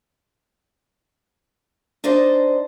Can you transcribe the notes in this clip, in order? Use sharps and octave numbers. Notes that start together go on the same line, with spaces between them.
D4 D#4 C5 D5 D#5